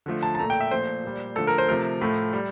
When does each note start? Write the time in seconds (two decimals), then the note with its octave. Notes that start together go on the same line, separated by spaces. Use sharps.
0.06 D3 F3 A3
0.23 A5
0.35 A5
0.39 A#2 A3 A#5
0.50 G5
0.61 E5
0.71 A#2 F3 A3 C5
1.04 A#2 G3
1.35 D3 F3 A3 A4
1.47 A#4
1.58 C5
1.68 C3 F3 A3 A#4
2.01 A2 F3 A3
2.33 G3